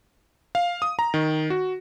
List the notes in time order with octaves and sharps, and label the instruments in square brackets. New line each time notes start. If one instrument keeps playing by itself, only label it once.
[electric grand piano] F5
D#6
A#5
D#3
F#4